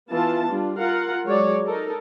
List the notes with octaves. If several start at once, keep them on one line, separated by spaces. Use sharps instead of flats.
E3 B3 E4 F4 A5
G3 D4 F4
F4 A#4 F5 F#5
F#3 G#3 C#5 D5
D#4 A4 A#4